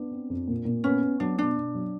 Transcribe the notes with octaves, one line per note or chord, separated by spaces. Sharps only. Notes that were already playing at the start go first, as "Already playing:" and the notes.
Already playing: B3 D4
C4
F2
A#2
A#2
B3 C#4
B3
F#3 D4
B2 D4
B2
F#3